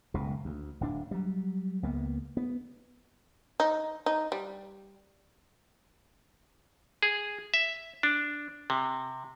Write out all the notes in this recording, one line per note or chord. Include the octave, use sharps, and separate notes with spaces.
F#1 C#2 B2
D2
D1 D4
F#3 G3
C#2 A#3 B3
B3
D#4
D#4
G3
G#4
E5
D4
C3